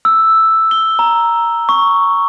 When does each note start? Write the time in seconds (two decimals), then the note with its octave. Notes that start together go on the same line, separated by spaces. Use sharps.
0.05 E6
0.71 G7
0.99 A#5
1.69 C#6